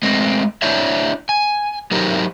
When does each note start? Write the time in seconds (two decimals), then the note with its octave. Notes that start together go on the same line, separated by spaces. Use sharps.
0.03 G#3 A3 C4 D#5
0.62 D4 E4 C5 C#5 E5
1.29 G#5
1.91 F#3 D#4 G4 A#4 C5 A#5